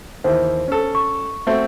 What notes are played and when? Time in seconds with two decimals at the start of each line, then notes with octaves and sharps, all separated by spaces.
0.24 D#2 E3 C5
0.68 C#4 A4
0.95 C#6
1.47 A3 C4 F#4